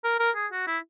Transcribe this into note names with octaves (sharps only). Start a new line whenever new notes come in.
A#4
A#4
G#4
F#4
E4